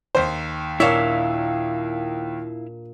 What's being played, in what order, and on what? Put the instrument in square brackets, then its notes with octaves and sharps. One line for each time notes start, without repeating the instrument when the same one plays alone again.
[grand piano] D#2 D#3 [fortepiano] C5
[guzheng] A#2 D4 E5 [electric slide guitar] E4 F5 [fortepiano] C#5